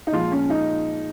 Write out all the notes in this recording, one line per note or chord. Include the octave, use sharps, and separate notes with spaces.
D#4
A#2 F3 G#3 F4
C#4
D#4